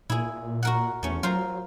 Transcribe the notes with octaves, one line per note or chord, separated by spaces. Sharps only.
A#2 E4 G#4
F#4 A#4 F#5
E2 A3 C#4
F#3 F4 A#4 C5